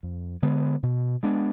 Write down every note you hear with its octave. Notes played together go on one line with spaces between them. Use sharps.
F2
D3 G#3 B3
B2
G#3 B3 D4